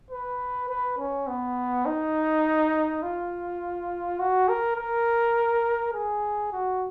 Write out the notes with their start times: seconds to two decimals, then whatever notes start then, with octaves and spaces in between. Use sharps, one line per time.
0.11 B4
0.69 B4
0.98 C#4
1.27 B3
1.86 D#4
3.03 F4
4.19 F#4
4.48 A#4
4.77 A#4
5.93 G#4
6.52 F#4